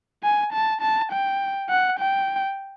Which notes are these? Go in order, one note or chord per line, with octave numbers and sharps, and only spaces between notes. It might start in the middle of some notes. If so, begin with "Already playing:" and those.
G#5
A5
A5
G5
F#5
G5